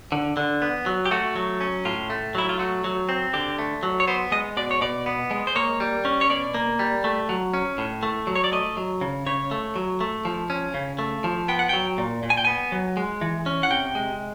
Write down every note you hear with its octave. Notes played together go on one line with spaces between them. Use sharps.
D3
D3
B3
F#3
G4
A3 F#4
F#3
C#4
A2 F4
A3
F#3 E4
F4
A3 F#4
F#3
C4
D3 G4
A3
F#3
C#5
B3 C5
G#3 D#5
B2 D5
C#5
B2 D5
B3
G#3
C5
A#3 C#5
G3
C#4
C#5
B2 D5
A#3
G3
A3
F#3
C#4
A2
A3
F#3
C#5
D5
A3 D#5
F#3
C#3
C#3 C#5
A3
F#3
A3
F3
C#4
C#3
A3
F3
B3 G5
F#5
F#3 G5
A#2
A#2
G#5
G5
B3 G#5
F#3
G#3
E3
C#4
F#5
C3 G5
G#3